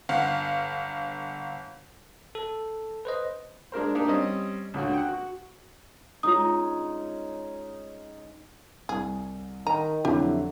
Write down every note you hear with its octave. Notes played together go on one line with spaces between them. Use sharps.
G1 F5 F#5
A4
B4 C5 D#5
G#3 D4 A#4 C5
A#3 D4 D#4 G4
G3 C4 C#4 D#5
C#2 D3 F#4
F#5 G5
F#4
G#3 C#4 D#4 F4 D#6
C2 G#4
D#3 A#5 D#7
F2 D3 F#3 E4 G4